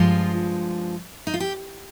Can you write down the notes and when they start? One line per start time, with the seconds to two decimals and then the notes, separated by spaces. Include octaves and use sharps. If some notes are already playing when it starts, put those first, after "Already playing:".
Already playing: G2 F3 G#3 F4
1.27 D#4
1.34 F4
1.40 G4